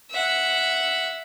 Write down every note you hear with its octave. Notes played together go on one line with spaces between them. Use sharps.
E5 F#5